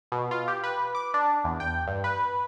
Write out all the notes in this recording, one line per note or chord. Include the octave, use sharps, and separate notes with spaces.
B2
F4
G4
B4
D6
D4
E2
G5
G2
B4